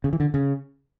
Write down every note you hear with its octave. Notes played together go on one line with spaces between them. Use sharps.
C#3
E3
D3
C#3